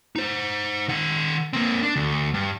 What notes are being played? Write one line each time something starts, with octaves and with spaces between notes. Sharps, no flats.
D#4 C5
D#3 F#5
A#3 C4
D4
D2
G2